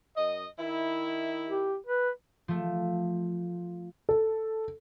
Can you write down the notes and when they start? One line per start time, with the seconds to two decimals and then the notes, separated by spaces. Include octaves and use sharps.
0.16 F#2 D#5
0.59 D#3 E4
1.48 G4
1.86 B4
2.48 F3 A3
4.09 A4